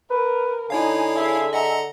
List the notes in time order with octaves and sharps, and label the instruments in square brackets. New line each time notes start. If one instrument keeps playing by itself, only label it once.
[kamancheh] A#4 [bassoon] B4
[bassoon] D3 [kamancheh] D#4 G#5 [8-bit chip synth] E4 C#5 F5
[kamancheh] G#4 E5
[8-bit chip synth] D#5 F#5 A#5